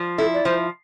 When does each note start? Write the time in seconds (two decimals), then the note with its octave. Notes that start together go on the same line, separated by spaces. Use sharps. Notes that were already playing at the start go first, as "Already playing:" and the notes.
Already playing: F3
0.18 E4 A4
0.34 D5
0.45 F3 C5